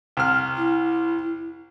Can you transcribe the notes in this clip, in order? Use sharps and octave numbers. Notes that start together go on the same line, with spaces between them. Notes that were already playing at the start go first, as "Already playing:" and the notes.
C2 F6
E4